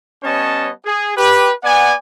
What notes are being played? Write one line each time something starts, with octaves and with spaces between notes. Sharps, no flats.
G3 B3 C#4 C#5 D#5 A5
G#4
G4 B4
B3 D5 F#5 G#5